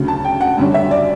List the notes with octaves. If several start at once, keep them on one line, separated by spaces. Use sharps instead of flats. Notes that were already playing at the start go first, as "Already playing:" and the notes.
Already playing: D2 C#3 F#3
A5
G5
F#5
F#2 D3 G3 C#4
E5
D5